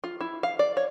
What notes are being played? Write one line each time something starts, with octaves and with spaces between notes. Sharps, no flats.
F4
E4
F5
D5
C#5